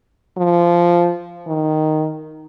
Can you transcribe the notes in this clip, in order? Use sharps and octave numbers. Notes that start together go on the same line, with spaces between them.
F3
D#3